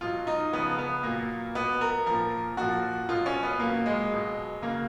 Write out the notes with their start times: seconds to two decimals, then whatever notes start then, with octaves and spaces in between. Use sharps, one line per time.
0.01 B2 F#3 F4
0.27 D#4
0.53 C#3 F3 B3
0.79 B3
1.03 A#2 F#3 A#3
1.55 B2 F#3 B3
1.81 A#4
2.06 A#2 F3 A#4
2.57 A#2 F3 F#4
3.09 B2 F#3 F4
3.26 C#4
3.43 B3
3.60 A#2 F#3 A#3
3.86 G#3
4.11 B2 F#3
4.62 C#3 F#3 A#3